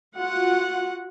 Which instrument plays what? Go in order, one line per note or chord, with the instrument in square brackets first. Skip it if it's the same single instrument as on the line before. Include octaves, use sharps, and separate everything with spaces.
[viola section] F4 F#4 F#5